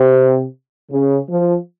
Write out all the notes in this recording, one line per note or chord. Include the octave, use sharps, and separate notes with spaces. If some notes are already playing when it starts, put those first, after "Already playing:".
Already playing: C3
C#3
F3